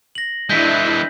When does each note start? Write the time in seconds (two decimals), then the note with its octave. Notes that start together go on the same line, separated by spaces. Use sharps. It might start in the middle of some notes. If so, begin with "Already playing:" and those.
0.15 A#6 F#7
0.50 E3 G#3 D4 E4 G6 B6